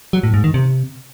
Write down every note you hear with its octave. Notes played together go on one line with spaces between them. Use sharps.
F#3
A2
G#2
D#3
C3